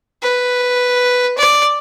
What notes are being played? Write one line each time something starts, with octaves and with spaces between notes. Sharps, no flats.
B4
D5